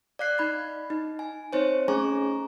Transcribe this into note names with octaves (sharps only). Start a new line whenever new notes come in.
D5 F5 F#6 C7
D#4 B5 G#6
D#4
G#5
C4 D#4 C5 C#5
A3 C#4 G#4 G#5 A#5 C#6